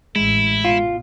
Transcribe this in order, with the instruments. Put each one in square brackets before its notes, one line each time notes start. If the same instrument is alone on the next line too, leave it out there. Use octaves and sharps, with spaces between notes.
[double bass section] A1 [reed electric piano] G#3 [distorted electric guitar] E4
[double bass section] B2 [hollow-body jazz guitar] F4